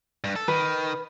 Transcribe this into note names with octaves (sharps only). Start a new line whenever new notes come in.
G2
A4
D#3 B4